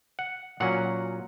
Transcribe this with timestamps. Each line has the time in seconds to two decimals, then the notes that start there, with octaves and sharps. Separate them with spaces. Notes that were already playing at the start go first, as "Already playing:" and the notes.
0.19 F#5
0.60 A#2 F#3 C#4 F#5